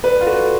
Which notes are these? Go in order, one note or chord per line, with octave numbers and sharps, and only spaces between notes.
B4 D5
F4
F#4 A4